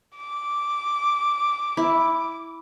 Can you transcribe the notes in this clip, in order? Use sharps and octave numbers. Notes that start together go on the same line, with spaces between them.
D6
E4